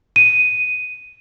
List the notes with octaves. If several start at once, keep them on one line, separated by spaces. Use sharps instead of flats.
D#7